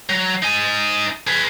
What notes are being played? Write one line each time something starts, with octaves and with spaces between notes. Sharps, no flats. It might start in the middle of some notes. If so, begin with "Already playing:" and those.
F#3
D#4 G#5
G#4 B4